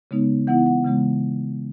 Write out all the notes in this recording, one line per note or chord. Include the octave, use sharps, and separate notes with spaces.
C#3 G#3 B3 D#4
E3 B3 E4 F#5
F#5
C#3 E3 G#3 B3